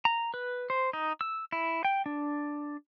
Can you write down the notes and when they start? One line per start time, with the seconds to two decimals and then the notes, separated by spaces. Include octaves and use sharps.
0.05 A#5
0.34 B4
0.70 C5
0.93 D#4
1.21 E6
1.52 E4
1.85 G5
2.06 D4